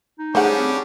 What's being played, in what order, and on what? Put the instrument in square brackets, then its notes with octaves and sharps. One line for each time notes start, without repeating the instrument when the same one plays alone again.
[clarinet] D#4
[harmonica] G3 C#4 D4 [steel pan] A3 G#4 [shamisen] C5 F#5
[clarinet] C4